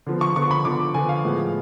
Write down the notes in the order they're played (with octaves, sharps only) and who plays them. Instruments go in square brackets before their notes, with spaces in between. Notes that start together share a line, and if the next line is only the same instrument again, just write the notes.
[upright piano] D3 F3 B3
C#6
D3 F3 B3 C#6
B5
D3 F3 B3 D6
D3 F3 B3 G#5
F5
A2 F3 G#3 B3